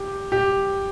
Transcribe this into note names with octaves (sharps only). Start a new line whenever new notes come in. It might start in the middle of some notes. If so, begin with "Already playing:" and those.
Already playing: G4
G4